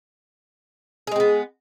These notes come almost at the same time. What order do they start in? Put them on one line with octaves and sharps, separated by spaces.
G#4 G#3 C4 B3